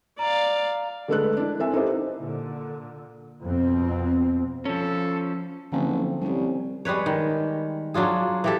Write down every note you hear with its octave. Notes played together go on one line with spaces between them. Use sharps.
D5 F5 A#5
D3 G#3 A3 A4 B4 F#6
D4 E4
C4 A4 E5 G#5
D#4 E4 G4 A4 C5 D#5
A#2 D3
F2 B2 C4
F3 C#4 A4
F#1 D3 F3 C4
C2 G3 C#4
G3 G#3 B4 C#5
D#3
F#3 D4 F4 G#4
E3 G4 A4